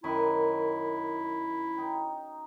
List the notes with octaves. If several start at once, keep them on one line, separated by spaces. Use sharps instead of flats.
F#2 D#3 E4 B5
D#4 G5